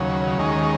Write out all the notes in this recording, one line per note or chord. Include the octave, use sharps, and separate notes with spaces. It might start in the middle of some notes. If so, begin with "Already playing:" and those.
Already playing: D#2 C#3 F#3
D#2 D#3 G#3 C#4